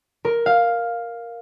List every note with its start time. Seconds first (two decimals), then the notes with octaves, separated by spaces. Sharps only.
0.25 A#4
0.46 F5